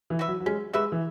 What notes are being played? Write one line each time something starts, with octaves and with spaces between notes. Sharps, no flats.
E3
F#4 B4 E5
F#3
F#3
G#3 C#4
G#3 F#4 B4 E5
E3